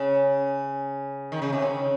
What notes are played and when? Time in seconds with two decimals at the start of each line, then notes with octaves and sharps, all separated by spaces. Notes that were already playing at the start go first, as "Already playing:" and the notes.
Already playing: C#3
1.32 D#3
1.42 C#3
1.53 C3
1.62 C#3